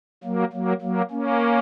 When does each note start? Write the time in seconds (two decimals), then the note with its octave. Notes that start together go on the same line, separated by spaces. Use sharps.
0.24 F#3 A#3
0.53 F#3 A#3
0.81 F#3 A#3
1.11 A#3 C#4